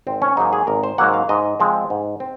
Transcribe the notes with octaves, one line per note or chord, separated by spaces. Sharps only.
G#1 C4
C#4
G#2 F#3 A#3 D#4
G#4
G#1 A#4
C5
G#2 F#3 A#3 F#5
F5
G#2 D#5
F3 G#3 C4
G#2
C4